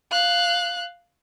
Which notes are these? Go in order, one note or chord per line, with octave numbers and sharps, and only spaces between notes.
F5 F#6